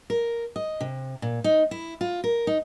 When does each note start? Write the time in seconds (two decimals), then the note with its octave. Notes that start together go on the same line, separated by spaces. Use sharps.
0.10 A#4
0.56 D#5
0.81 C3
1.22 A#2
1.44 D#4
1.71 E4
2.01 F4
2.24 A#4
2.47 D#4